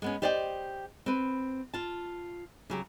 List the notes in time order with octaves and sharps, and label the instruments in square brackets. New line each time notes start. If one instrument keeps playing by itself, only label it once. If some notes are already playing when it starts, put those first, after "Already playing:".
[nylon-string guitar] G#3 B3 C#4
G4 C5 D5 D#5 F5 G5
C4 B4
F4 A5
C#3 F#3 G4